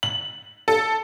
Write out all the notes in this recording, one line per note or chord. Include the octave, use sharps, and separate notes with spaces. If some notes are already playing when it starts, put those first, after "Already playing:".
F#7
A4